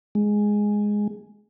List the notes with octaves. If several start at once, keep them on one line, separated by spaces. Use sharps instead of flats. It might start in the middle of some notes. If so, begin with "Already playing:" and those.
G#3